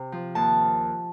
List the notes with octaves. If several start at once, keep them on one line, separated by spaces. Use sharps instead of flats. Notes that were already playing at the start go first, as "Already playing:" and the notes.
Already playing: C3
F3
D#2 A5